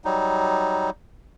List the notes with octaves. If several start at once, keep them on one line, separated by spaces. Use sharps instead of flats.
F#3 G3 D#4